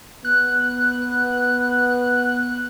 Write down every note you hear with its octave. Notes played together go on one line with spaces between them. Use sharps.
B3 F#6